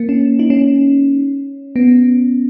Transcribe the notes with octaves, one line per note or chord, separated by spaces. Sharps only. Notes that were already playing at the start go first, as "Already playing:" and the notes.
Already playing: A#3
C#4
D#4
C#4
B3